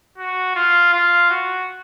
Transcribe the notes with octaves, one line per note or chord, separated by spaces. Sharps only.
F#4
F4
F4
F#4